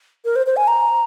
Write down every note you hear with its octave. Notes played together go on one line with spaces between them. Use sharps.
A#4
C5
C5
G#5
A#5